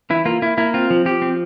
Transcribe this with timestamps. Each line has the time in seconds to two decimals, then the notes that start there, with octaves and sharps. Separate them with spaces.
0.10 E3 E4
0.25 A#3 F4
0.42 A#3 E4
0.58 A#3 E4
0.74 C4 F4
0.90 F3
1.05 F3 G4
1.22 C4